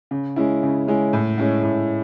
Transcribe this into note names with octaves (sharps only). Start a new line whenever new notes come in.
C#3
G#3 C#4 E4
C#3
G#3 C#4 E4
A2
G#3 C#4 E4
A2